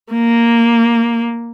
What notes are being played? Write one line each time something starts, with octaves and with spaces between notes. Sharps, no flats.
A#3